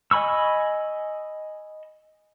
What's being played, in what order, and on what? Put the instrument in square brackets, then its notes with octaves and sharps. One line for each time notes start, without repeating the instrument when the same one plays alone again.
[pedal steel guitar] D#5 G#5 B5 C#6 E6